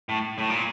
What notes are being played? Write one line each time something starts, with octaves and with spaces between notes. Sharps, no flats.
A2
A2
A#2